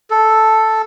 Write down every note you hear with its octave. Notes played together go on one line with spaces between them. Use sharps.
A4